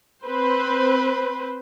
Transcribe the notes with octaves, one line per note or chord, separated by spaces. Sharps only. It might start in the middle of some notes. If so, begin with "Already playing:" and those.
C4 B4 C5